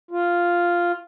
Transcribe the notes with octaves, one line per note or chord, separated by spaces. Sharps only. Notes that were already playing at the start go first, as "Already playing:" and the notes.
F4